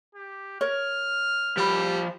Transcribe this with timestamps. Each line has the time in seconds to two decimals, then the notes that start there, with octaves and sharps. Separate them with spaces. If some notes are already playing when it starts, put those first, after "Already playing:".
0.15 G4
0.61 A#4 C#5 F6
1.57 F3 G3 B5